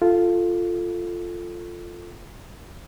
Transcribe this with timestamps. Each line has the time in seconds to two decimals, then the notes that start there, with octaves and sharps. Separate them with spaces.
0.02 F4 A4